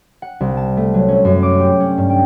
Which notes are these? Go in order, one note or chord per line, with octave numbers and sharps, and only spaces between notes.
F#5
C2
A5
A3
F#3
C#4
F#2
D6
G4
C#4
G2
G5